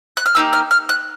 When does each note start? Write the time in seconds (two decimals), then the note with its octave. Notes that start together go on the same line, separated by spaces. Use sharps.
0.17 F#6
0.26 F6
0.35 A#3 D#4 G4 E6
0.53 F6
0.71 F6
0.89 F#6